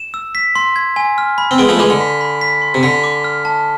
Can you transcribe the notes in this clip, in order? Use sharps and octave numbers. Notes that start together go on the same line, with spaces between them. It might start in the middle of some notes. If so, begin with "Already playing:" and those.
Already playing: E7
E6
B6
C6
G#6
G#5
F6
B5
C4
G#3 B3 D7
F3 A3
E3 G#3 D6
D3
B6
B5
B6
C6
C3
D3 B6
D6
F6
A5